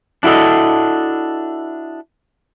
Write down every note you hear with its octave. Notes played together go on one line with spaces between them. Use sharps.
D4 E4 F#4 A4 D#5